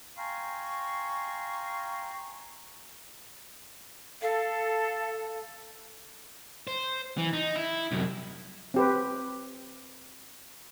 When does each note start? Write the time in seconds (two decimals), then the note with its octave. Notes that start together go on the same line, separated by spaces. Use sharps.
0.18 F5 G5 G#5 A#5 C6 C#6
4.22 A4 F5
6.67 C5
7.18 E3
7.33 D#4
7.56 E4
7.91 C2 F#2
8.74 C4 G4 B4